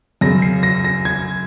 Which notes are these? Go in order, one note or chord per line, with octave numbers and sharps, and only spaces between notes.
F#2 C#3 A#6
C7
A#6
A#6
G#6